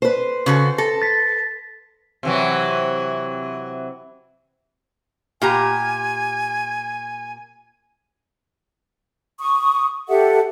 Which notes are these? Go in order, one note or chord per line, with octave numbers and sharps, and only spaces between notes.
B4 C5
C#3 F#4 A4
A4 A#6
A6 B6
C3 E3 F#3
A#2 G4 G#5 A#5
C#6 D#6
G4 A4 E5 F#5